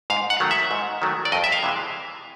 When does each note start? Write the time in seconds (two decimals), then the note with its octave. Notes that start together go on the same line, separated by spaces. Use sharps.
0.10 G#2 F5
0.30 F#5
0.40 D#3 F#3 A3
0.51 E5
0.71 G#2
1.02 D#3 F#3 A3
1.25 D5
1.32 F2 D#5
1.44 E5
1.52 F5
1.63 C3 E3 G#3